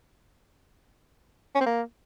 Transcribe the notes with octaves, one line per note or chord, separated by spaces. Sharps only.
C#4
C4
A#3